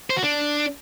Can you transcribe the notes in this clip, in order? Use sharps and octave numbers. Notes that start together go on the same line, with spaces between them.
C5
F#4
D4